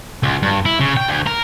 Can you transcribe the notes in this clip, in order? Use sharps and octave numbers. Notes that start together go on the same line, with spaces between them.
C#2
G2
E4
C#3
G5
D2
A#4